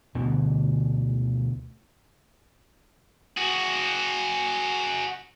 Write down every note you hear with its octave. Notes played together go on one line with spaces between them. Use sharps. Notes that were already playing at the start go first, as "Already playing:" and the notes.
D2 B2 D3 E3
F#4 G#4